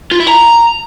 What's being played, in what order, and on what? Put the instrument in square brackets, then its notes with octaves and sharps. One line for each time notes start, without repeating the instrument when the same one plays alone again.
[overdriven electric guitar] F4
E4
A#5